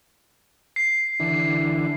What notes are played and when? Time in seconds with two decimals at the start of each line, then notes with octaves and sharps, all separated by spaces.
0.76 C7
1.20 D3 E3